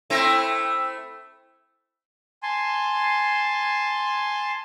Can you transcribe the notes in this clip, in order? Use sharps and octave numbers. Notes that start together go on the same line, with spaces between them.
A3 C4 E4
G#5 A5 C6